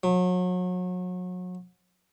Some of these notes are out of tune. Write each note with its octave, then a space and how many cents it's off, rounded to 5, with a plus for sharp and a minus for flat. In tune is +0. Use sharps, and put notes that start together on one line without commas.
F#3 -35